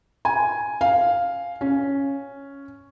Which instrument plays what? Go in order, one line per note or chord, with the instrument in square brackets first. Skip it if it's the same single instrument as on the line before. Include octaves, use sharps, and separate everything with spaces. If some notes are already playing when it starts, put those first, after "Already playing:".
[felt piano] G#5
F5
C#4